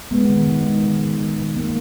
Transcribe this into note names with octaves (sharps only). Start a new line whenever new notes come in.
G#3 B3
D#3
D#3
G#3
D#3
D#3
D#3
D#3
D#3 A#3